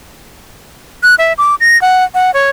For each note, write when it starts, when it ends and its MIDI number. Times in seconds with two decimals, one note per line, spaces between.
1.03 1.15 90
1.19 1.33 76
1.38 1.55 86
1.60 1.80 94
1.82 2.04 78
2.14 2.31 78
2.34 2.50 73